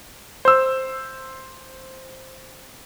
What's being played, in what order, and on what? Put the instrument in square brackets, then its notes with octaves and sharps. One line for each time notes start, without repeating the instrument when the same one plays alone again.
[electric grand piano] C5 E6